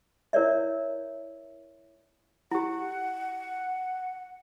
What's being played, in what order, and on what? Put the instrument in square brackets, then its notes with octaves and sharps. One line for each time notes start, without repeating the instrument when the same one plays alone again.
[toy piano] E4 A#4 C#5 D5 E5
[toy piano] E4 G4 [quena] F#5